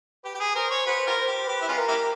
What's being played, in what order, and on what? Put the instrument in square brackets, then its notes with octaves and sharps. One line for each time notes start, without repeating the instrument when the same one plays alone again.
[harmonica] G4 [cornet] B4
[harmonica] G4
G#4
[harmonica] A#4 [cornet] C5
[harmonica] C#5
[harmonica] F#4 G#4 B4 [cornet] C5
[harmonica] F4 G4 A#4
[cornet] C5
[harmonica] G4
[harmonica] G4 [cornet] B4
[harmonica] E4
G#3 C#4 F4
[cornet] A#4
[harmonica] A#3 E4 G4